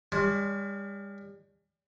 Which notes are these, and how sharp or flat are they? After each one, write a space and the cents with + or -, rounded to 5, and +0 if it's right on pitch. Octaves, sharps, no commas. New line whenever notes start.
G3 +40 D4 -45 C6 +0